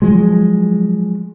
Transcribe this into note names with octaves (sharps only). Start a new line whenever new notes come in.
F3 F#3 G#3